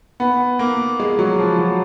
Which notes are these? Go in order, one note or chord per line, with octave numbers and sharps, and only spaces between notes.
B3
A#3
G#3
F#3
F3
F#3